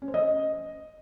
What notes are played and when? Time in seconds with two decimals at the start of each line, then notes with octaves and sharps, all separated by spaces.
0.02 C#4
0.08 C5
0.14 D#5